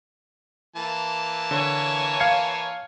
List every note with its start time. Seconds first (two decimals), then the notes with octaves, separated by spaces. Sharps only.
0.76 E3 A#3 A5
1.51 D3 C#5 G#5
2.20 F5 G#6 C#7